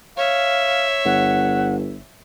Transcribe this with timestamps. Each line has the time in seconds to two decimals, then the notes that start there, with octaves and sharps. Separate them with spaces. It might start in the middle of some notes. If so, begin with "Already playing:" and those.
0.17 C#5 E5 F5
1.05 G1 F#5